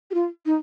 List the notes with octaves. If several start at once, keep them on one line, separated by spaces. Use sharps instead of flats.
G4
F4
D#4